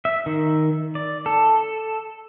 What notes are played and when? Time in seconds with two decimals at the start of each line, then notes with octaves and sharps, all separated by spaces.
0.05 E5
0.26 D#3
0.95 D5
1.26 A4